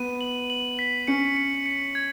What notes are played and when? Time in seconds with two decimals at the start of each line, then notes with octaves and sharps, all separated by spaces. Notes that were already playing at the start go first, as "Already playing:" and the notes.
Already playing: B3 D#7
0.21 F#7
0.50 F#7
0.79 B6
1.07 C#4 C#7
1.37 C#7
1.66 C#7
1.95 G#6